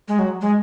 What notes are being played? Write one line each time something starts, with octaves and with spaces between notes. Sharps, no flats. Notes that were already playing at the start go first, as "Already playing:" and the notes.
G#3
F#3
G#3